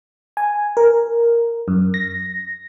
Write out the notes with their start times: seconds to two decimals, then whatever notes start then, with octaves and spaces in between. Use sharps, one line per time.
0.37 G#5
0.77 A#4
1.68 F#2
1.94 A#6